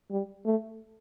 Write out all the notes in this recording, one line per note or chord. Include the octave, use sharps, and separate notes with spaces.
G3
A3